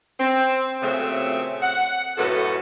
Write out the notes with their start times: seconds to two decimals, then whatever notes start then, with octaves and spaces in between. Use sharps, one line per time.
0.19 C4
0.82 A#2 C#3 F#3 A3 C4 E5
1.63 F#5
2.18 F#2 A2 C#3 F#4 A4 B4